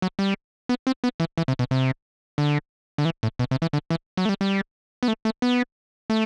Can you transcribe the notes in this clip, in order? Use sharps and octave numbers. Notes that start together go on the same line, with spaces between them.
F#3
G3
B3
C4
B3
E3
E3
C3
B2
C3
D3
D3
E3
A2
B2
C3
E3
D3
E3
F#3
A3
G3
G3
B3
A3
A3
B3
A3